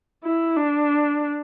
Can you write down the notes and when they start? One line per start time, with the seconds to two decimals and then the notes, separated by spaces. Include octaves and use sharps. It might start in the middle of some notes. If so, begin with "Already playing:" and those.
0.24 E4
0.56 D4